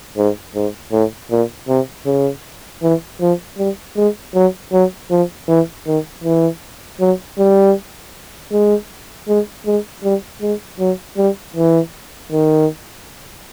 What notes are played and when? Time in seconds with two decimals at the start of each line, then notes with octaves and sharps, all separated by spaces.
0.17 G#2
0.55 G#2
0.92 A2
1.31 A#2
1.68 C3
2.06 C#3
2.83 E3
3.21 F3
3.58 G3
3.96 G#3
4.35 F#3
4.73 F#3
5.11 F3
5.49 E3
5.87 D#3
6.24 E3
7.00 F#3
7.39 G3
8.52 G#3
9.28 G#3
9.66 G#3
10.04 G3
10.42 G#3
10.80 F#3
11.18 G3
11.56 E3
12.32 D#3